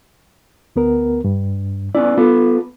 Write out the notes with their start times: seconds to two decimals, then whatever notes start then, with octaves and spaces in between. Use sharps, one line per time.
0.76 D2 B3 A#4
1.24 G2
1.95 B3 C#4 E4 D5
2.17 B3 F4 A4 B4